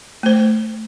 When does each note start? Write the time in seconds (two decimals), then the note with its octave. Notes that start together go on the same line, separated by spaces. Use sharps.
0.23 A3 C5